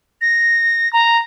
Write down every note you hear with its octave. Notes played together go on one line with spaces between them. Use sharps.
A#6
A#5